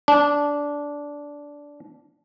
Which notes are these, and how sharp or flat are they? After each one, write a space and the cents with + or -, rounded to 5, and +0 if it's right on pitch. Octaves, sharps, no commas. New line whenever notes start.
D4 -15